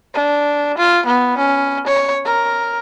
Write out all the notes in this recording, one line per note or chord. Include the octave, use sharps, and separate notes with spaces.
D4
F4
B3
C#4
C#5
A#4